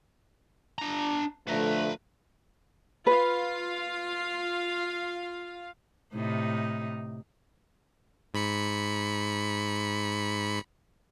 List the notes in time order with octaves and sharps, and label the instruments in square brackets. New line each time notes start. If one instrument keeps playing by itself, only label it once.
[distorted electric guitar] D4 A#5
[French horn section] D3 F3 A3 [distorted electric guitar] B4 A#5
[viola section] F4 F5 [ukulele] B4
[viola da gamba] A2 C3 D#4
[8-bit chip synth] G#2 B5 C#7